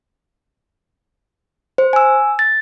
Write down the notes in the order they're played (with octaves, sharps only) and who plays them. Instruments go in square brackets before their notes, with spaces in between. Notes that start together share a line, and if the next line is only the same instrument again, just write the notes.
[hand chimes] C5
G#5 E6
A6